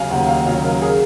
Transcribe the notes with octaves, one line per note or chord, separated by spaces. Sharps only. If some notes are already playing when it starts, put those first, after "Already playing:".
Already playing: D#2 C#3 F#3 F5 G#5
D#2 F#5
F5
C#3 F#3 F5
A#4
G#4